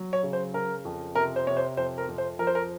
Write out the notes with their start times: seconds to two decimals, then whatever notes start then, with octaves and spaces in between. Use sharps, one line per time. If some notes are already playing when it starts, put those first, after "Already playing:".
Already playing: F#3
0.13 C#5
0.23 C#3
0.33 C5
0.54 C#3 A#4
0.85 F2
1.15 C3 A#4
1.36 C5
1.47 C3 C#5
1.57 C5
1.77 F2 C5
1.98 A#4
2.08 F2
2.18 C5
2.39 F3 A#4
2.47 C5
2.55 A#4